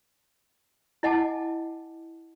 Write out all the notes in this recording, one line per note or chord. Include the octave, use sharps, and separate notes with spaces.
E4 D#5 F#5 G#5 A5 D6